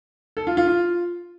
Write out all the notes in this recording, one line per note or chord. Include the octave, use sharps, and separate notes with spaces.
A4
F4
F4
F4